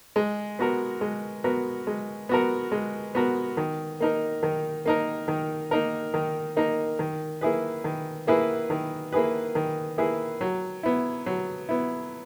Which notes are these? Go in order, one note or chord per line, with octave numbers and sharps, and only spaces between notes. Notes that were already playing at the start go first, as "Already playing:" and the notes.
G#3
B3 F#4 A#4
G#3
B3 F#4 A#4
G#3
B3 F#4 A#4
G#3
B3 F#4 A#4
D#3
A#3 D#4 A#4
D#3
A#3 D#4 A#4
D#3
A#3 D#4 A#4
D#3
A#3 D#4 A#4
D#3
A#3 E4 G#4 B4
D#3
A#3 E4 G#4 B4
D#3
A#3 E4 G#4 B4
D#3
A#3 E4 G#4 B4
F#3
B3 E4
F#3
B3 E4